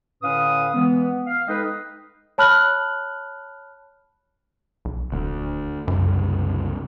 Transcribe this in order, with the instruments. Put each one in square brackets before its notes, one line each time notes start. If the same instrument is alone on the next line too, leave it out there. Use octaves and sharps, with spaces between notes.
[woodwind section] A2 D3 C#4 B4 F5 D#6
E3 G#3 B3
F5
G#3 D#4 A4 B4 D#5 G5
[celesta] C#5 A5 B5 F6 F#6 F#7
[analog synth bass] B1
[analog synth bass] D#1 [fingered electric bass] D2
[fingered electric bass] F#1 C2 [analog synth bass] F#2